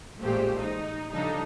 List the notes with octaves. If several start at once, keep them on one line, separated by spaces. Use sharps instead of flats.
A1 A#2 G#3 A3 G4 C5
D#4
C#3 F3 G3 D4 D#4 A4